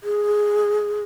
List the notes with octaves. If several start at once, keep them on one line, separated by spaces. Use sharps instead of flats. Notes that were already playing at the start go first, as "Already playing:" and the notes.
G#4